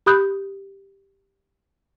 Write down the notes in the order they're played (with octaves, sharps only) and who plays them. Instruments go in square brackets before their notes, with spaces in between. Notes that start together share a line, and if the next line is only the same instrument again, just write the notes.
[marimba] G4 B5 D#6 F#6 G6